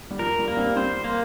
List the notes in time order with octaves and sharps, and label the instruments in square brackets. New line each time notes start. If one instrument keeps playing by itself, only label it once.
[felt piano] G3
[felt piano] F3 [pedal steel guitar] A#4
[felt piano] G3
[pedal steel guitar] A#3
[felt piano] G3 C4
[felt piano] G3 C4 [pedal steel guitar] C5
[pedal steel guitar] A#3